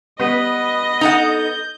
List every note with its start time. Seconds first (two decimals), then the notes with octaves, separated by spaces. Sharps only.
0.19 G3 B3 B4 D#5
1.01 D#4 A4 F#5 G6